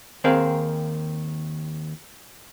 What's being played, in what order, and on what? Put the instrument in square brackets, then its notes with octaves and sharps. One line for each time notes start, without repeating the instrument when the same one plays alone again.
[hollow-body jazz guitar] D#2 C4 G#4 A#4 F5